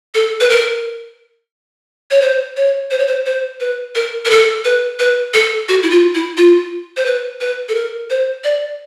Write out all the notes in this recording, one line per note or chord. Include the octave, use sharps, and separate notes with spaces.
A4
B4
A#4
C#5
C5
C#5
C5
C#5
C5
C5
B4
A#4
A#4
A4
B4
B4
A4
F#4
E4
F4
E4
F4
C5
B4
B4
A4
A#4
C5
D5